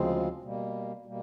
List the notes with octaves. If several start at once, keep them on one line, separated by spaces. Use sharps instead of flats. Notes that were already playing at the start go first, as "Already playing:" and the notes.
Already playing: D2 C#3 F3 G#3 C4
B2 G3 A#3
B2 G3 A#3